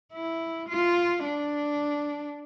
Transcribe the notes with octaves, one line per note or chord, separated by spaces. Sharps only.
E4
F4
D4